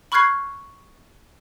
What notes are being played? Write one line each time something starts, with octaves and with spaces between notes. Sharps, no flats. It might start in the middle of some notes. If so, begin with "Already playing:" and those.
B5 C#6 F6 F#6 G#6 C7